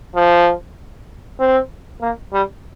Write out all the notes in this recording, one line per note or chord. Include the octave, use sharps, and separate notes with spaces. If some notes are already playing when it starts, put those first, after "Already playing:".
F3
C4
A#3
G3